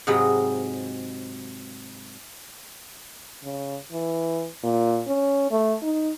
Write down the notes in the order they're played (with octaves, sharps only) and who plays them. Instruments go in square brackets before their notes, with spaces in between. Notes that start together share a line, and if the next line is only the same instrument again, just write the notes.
[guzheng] G#2 C3 F#3 D#5 F5 B5
[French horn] C#3
E3
A#2
C#4
A3
D#4